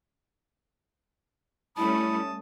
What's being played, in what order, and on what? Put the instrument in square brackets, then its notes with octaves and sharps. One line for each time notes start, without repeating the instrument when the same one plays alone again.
[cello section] G3 A3 C#4 [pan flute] E4 [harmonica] A5 D#6 [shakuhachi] B5